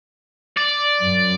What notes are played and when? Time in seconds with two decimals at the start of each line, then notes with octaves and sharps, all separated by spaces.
0.57 D5
1.01 F#2